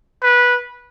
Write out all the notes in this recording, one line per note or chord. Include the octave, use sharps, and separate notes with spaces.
B4